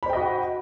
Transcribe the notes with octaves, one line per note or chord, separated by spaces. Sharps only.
F#4 C5 D#5 G5 B5